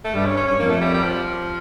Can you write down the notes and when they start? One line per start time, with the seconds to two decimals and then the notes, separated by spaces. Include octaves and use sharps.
0.05 A3
0.14 G2 G3
0.26 C#4
0.37 C#4
0.48 G2 C#4
0.59 F2 A#3
0.70 A3
0.81 G3
0.94 G3
1.04 F3